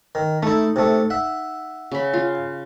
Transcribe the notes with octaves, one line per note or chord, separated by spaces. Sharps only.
D#3
A3 D#4 E4
C3 A3
E5 F#5
C#3 B5
F4